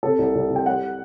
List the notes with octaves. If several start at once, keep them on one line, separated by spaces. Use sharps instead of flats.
C3 A4
C2
C2
C2
G5
G3 F#5